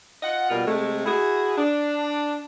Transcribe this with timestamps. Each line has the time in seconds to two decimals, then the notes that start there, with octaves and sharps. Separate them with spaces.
0.23 F4 D#5 F#5
0.50 B2 G3 A#3 F4 A#4
0.66 C3 G#3 A3
1.05 E4 F#4 G#4
1.57 D4